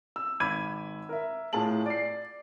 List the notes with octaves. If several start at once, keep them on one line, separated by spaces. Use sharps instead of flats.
E6
G#1 B5 D6 G#6 D#7
A#4 E5
A2 F4 G#4 A5 F#7
D5 C7